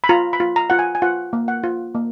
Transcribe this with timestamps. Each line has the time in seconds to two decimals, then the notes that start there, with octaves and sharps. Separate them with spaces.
0.04 B5
0.09 F4 A#5
0.33 B5
0.40 F4
0.56 A#5
0.70 F4 F#5
0.79 G#5
0.95 G#5
1.02 F4 F#5
1.33 A#3
1.48 F#5
1.64 F4
1.94 A#3